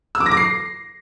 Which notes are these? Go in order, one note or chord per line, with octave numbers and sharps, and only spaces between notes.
E6
D6
A#6
D6
C7